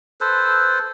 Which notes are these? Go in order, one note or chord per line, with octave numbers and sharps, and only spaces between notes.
A4 B4 C5